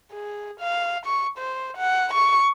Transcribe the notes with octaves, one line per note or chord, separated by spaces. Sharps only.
G#4
F5
C#6
C5
F#5
C#6